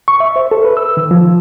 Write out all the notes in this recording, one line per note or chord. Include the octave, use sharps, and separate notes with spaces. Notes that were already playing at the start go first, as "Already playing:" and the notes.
C#6
E5
C5
A4
B4
E6
D#3
F3